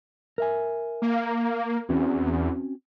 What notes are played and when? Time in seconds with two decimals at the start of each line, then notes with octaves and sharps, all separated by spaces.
0.38 A#4 E5 G#5
1.02 A#3
1.89 E2 C4 C#4 F#4